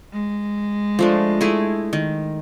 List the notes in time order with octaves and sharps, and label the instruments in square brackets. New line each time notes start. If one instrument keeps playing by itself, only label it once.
[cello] G#3
[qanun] F3 A3 D4
A3 E4 G#4
D#3